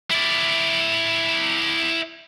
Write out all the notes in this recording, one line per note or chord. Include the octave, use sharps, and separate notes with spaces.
E4 D5